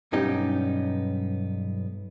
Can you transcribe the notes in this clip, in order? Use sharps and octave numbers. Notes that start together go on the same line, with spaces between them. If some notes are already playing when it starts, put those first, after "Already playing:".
B1 G2 B3 C#4 D#4 G4